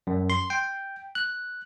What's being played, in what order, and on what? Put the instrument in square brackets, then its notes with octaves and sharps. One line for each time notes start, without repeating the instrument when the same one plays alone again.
[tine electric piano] F#2
C6
G5
F#6